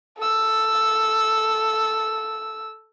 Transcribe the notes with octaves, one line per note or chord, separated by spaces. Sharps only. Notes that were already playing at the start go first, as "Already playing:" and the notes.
A4 E6